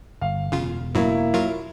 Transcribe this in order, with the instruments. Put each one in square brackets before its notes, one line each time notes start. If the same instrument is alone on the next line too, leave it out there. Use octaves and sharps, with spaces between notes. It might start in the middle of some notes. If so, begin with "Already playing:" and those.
[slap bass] G1 [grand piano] F5
[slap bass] E1 [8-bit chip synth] C#3 F4
[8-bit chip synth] F#2 A2 F#3 [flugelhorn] A#3 [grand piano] E4
[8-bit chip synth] F#3 F4 A#4